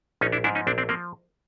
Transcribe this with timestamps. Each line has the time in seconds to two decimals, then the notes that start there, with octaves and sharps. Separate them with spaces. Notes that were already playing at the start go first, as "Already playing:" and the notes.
0.21 A#1 C#4 D#4
0.32 D4 E4
0.44 G#2 F3 D4 E4
0.55 C#4 D#4
0.67 A#1 C4 D4
0.78 C4 D4
0.89 F3 A#3 C4